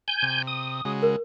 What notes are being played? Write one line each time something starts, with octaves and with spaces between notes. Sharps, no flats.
G#5 G6
C3
D#6
C#3 G#3 F#4
A#4